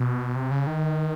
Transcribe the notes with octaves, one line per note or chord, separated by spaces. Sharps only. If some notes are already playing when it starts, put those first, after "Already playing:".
Already playing: B2
C3
C#3
D#3